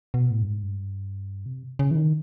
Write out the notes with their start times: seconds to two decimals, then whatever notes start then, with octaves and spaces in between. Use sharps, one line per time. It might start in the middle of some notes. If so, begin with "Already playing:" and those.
0.14 B2
0.31 A2
0.42 G2
0.47 G#2
0.63 G2
1.46 C3
1.79 C#3
1.91 E3
1.95 D#3